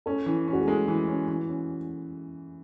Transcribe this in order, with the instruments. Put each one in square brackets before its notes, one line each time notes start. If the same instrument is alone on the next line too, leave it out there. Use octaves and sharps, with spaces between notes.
[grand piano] C#4 [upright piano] A4
[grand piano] E3
C#4
[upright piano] F#4
G#4
[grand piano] G#3 [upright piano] A4
[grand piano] E3
C#4
E3
C#4